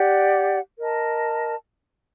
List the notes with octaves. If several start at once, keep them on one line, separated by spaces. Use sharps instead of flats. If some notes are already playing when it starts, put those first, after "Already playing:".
Already playing: G4 D5 F#5
A#4 D#5 A5